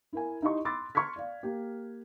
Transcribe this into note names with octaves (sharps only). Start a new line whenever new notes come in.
E4 A#4 G#5
D#4 E4 G4 D#5 C6 C#6
B5 C6 D6 E6 F#6 A6
C6 C#6 F6 G#6 B6
D5 F5
A#3 G4